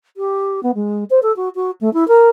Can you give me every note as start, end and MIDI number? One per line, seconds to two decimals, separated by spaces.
0.17 0.63 67
0.63 0.71 59
0.75 1.04 56
1.10 1.19 72
1.22 1.34 69
1.36 1.49 66
1.55 1.71 66
1.81 1.92 57
1.93 2.07 64
2.08 2.29 70